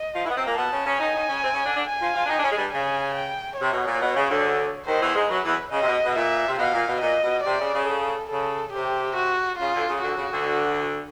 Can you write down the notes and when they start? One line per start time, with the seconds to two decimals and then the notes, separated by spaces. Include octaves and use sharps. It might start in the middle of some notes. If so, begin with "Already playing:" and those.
Already playing: D#5
0.13 F3 F4
0.24 E3 E4
0.29 B3
0.35 C3 C4
0.45 A#2 A#3
0.56 B2 B3 A5
0.70 C#3 C#4
0.85 C#3 C#4
0.99 D#3 D#4 G#5
1.13 D#3 D#4
1.28 C#3 C#4
1.42 C3 C4
1.53 C#3 C#4
1.64 D3 D4
1.74 D3 D4
1.85 G#5
2.00 F3 F4
2.13 F3 F4
2.23 D4
2.28 D#3 D#4
2.38 D4
2.43 C#3 C#4
2.50 G#3
2.57 G2 G3
2.71 C#3 G#5
3.15 G5
3.57 C3 C#5
3.72 B2
3.86 A#2
4.00 B2
4.15 C#3
4.28 D2 D3
4.86 D#2 D#3 C5
5.00 E2 E3
5.15 G#2 G#3
5.29 F#2 F#3 B4
5.43 E2 E3
5.72 C#3 D#5
5.81 C3
5.86 B2
6.05 B2
6.15 A#2 E5
6.47 C3
6.58 B2 F5
6.73 A#2
6.87 B2
7.01 A#2 D#5
7.23 B2
7.44 C3 D5
7.59 C#3
7.73 C#3
7.87 A4
8.30 C#3 A4
8.73 C3 G4
9.16 F#4
9.58 C#3 F4
9.73 D2 D3
9.88 C#3
10.02 D2 D3 F#4
10.16 C#3
10.31 D2 D3